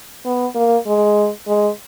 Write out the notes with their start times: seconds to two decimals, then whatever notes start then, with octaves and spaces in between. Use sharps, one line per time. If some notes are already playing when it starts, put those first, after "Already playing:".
0.25 B3
0.55 A#3
0.86 G#3
1.47 G#3